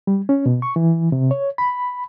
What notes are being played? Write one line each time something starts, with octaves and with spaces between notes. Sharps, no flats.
G3
C#4
B2
C#6
E3
C3
C#5
B5